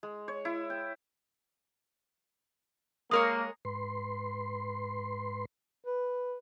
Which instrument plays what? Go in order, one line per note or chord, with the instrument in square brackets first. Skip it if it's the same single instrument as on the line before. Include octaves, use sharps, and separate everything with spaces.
[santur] G#3
C#5
E4
G5
[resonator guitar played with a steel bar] G#3 A#4 C#5 [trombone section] A#3 [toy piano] D#6
[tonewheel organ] G#2 B4 C6
[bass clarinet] B4